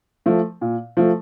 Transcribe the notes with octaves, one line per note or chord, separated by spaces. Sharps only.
F3 A3
A#2
F3 A3